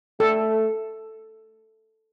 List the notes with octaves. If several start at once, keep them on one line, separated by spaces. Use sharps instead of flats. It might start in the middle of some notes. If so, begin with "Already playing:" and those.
A3 A4